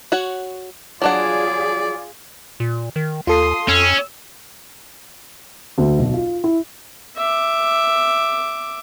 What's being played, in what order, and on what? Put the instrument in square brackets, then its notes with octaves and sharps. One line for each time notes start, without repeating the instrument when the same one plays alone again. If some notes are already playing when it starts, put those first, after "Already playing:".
[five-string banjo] F#4 C#5 F#5
[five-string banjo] F#3 D4 F#5 [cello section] F4 G#4 [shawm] D5
[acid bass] A#2
D#3
[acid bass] D#2 [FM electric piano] F4 A4 C7 [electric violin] C6 D#6
[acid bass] F2 [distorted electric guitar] C#4 [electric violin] E6
[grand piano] D2
B1
F4
E4
[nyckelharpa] E5 D6